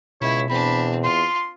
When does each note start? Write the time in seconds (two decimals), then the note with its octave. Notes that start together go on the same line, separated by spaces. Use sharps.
0.21 C#2 B2 E4 C#5
0.50 E2 C4 D4 B5
1.04 F4 C6